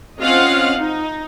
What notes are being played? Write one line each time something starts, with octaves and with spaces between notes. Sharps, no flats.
C4 C#4 F4 D#5 F5 F#5
D#4